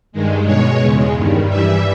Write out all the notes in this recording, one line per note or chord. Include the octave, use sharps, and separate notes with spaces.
G2 D#3 G#3
B2 G#3 C#5
E2 C#3 G#3
G2 D#3 G3
G2 E3 G3 E5